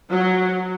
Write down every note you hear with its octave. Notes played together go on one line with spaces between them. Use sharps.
F#3